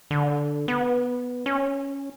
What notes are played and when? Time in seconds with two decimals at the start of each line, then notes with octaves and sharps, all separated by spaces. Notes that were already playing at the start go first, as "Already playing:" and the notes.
0.11 D3
0.68 B3
1.46 C#4